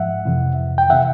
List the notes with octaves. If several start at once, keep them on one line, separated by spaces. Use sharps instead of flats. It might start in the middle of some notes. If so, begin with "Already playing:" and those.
Already playing: G#2 F3 E5 F#5
F2 C3 E3
G5
C3 E3 E5 F#5